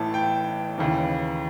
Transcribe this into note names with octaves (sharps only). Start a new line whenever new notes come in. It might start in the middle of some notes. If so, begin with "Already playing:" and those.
Already playing: A1 A2 E3 A5
G5
D#2 C#3 E3